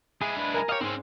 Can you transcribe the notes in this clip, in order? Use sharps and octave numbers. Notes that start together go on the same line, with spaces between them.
G#3 E4 G#4
D4 B4
A#4 G#5 A#5
G4 C#5 D#5 F5
G#2 C4 C#4 E6